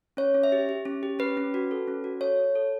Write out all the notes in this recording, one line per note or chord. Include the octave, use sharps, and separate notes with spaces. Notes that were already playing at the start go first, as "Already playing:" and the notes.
C#4 C#5
C#4
E5
G4
G4
C#4
G4
C#4 B4
C#4
F#4
A4
C#4
F#4
A4 C#5
A4
A4